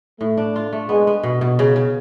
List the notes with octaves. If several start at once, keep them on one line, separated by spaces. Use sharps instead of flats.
A2 A3
D4
F4
A3
G#3 B3
B3
B2
B2
C#3
C#3